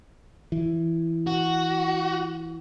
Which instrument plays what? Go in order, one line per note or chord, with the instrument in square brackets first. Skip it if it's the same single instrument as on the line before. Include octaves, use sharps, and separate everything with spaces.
[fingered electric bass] E3
[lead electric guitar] F#4